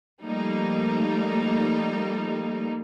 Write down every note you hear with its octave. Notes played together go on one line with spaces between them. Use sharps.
F3 G3 A3 A#3 D#4